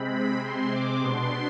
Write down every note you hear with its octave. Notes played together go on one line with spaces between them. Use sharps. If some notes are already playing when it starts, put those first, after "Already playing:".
Already playing: C3 G#3 C4 B5
C6
D6
B2 B3 D4 C6